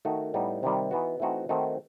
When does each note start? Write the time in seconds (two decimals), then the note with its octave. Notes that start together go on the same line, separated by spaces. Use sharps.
0.05 D#3 A3 D#4 F#4
0.34 A2 G3 B3 D#4
0.63 C3 D#3 G3
0.91 E3 B3 D#4 F#4
1.20 E3 A3 C4 D#4 F#4
1.49 D#3 A3 C4 D#4 F#4